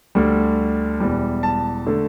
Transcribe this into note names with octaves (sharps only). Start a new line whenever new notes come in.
D2 D3 G3
E1 E2 E3 G3
A5
D3 A3